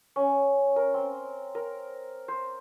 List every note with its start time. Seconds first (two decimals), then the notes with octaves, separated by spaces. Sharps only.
0.16 C#4
0.76 A#4
0.94 C4
1.55 A#4
2.28 C5